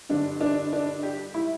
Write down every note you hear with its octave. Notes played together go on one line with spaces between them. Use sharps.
G2 D3 G3 D4
D4
D4
G4
G3 E4